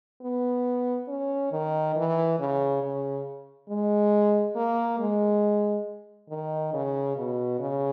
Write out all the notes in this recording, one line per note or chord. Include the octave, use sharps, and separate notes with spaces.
B3
C#4
D#3
E3
C#3
C#3
G#3
A#3
G#3
D#3
C#3
B2
C#3